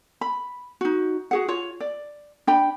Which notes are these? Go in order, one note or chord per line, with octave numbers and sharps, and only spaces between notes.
B5
D#4 F#4
F#4 G#4 F#5
F4 C#5
D5
D4 G5 B5